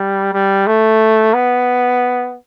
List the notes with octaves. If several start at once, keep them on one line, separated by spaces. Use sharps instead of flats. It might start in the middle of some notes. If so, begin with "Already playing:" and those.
Already playing: G3
G3
A3
B3